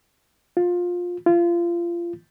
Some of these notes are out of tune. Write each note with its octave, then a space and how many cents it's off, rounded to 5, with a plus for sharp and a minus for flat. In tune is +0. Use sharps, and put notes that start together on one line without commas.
F4 +20
F4 -25